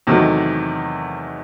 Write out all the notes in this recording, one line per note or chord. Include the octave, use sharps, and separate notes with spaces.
E2 C3 D#3 F#3 A3